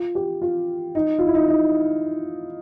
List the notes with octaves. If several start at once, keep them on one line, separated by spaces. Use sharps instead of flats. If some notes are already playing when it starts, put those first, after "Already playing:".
Already playing: F4
G4
F4
D#4
F4
E4
D#4
D#4